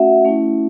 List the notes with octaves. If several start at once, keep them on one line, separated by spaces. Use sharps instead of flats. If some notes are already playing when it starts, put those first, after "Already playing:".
Already playing: A3 C#4 F#4 E5 F#5
A3 C#4 E4